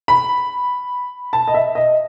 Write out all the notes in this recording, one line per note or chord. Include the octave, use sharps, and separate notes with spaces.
B5
A5
D#5
E5
D#5